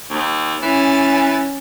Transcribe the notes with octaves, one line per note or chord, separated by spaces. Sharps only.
D#2
E3 C#4 A6